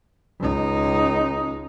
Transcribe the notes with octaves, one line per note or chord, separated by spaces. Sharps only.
C#2 D#4